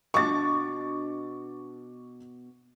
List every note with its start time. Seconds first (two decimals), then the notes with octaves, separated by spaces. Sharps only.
0.14 B2 D4 C#6 D6 A6